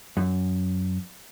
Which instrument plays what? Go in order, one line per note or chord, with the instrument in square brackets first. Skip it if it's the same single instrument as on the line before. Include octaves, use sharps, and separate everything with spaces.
[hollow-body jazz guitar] F#2